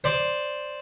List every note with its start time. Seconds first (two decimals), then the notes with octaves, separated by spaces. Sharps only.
0.04 C5 D5 C6